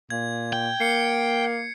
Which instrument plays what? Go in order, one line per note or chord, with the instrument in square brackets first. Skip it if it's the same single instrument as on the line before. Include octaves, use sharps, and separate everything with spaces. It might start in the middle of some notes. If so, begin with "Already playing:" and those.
[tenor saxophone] A#2 [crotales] G#6
[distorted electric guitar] G5
[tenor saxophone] A#3 [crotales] C7 C#7